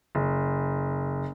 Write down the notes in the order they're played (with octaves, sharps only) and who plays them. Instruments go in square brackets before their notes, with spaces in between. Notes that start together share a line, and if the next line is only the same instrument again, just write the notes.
[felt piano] F#1